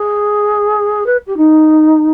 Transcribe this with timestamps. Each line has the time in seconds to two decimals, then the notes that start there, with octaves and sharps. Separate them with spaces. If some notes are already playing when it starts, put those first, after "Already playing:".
Already playing: G#4
1.06 B4
1.27 G4
1.37 D#4